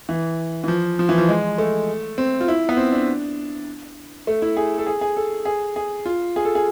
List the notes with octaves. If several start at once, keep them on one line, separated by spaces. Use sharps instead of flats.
E3
E3
F3
F3
E3
F3
G#3
A3
C4
F4
E4
B3
C4
D4
A3
E4
G#4
A4
G#4
G#4
A4
G#4
G#4
F4
G#4
A4
G#4